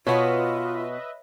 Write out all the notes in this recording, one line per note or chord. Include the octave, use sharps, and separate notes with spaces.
B2 B3 F4 B4 C#5 D#5 E5